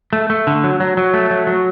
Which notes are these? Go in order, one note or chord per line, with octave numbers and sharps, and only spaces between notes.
A3
A3
D3
F#3
F#3
F#3
A3
F#3
F#3